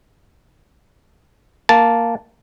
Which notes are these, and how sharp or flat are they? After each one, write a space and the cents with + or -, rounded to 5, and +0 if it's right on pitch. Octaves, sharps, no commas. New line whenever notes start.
A#3 +0 A5 +0